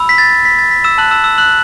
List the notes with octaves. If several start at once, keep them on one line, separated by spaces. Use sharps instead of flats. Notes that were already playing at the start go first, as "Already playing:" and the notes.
Already playing: B5 E6
B6
A6
B6
A6
B6
E6 E7
A5 E6 F#6 F#7
E6 E7
E6 E7
F#6 F#7